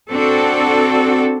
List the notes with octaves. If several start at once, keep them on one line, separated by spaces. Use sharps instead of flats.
C4 D4 F#4 A4